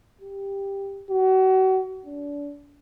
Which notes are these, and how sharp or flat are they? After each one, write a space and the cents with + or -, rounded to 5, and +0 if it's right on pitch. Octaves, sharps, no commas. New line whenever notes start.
G4 +10
F#4 +35
D4 -30